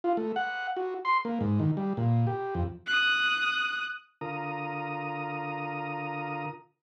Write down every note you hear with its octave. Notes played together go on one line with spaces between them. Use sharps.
F4
A3
F#5
F#4
C6
A#3
G#2
D#3
G3
A#2
G4
F2
D#6 F#6
D3 F4 A#4 A#5 D#6